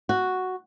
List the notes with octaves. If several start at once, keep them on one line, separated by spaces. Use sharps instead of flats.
F#4